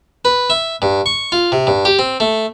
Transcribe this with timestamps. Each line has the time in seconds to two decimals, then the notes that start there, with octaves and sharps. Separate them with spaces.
0.25 B4
0.50 E5
0.82 G2
1.06 C#6
1.32 F4
1.52 C3
1.67 G2
1.85 G4
1.99 C4
2.20 A3